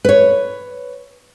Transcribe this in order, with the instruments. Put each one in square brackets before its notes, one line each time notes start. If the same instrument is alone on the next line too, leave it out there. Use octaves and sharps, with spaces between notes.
[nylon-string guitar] B4 C#5